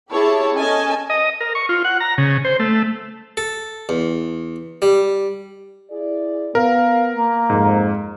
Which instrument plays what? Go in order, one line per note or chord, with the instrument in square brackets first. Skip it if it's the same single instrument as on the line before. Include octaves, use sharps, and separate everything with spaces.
[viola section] E4 G4 G#4 C#5 A5
C#4 A4 D#5 G#5 A5
[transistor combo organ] D#5
A#4
C#6
F4
F#5
A#5
C#3
C5
A3
[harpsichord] A4
E2
G3
[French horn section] E4 G#4 D5
[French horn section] B3 [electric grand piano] A#4 [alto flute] F5
[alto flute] A#3
[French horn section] F2 [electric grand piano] G#2